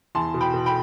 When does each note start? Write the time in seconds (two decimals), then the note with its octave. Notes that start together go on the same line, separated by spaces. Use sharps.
0.15 E2 A5 C6
0.34 B2
0.41 G5 B5
0.53 B2
0.66 G5 B5